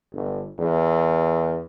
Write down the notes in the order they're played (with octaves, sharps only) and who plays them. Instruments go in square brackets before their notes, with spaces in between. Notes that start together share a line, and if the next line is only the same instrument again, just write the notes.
[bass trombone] G1
E2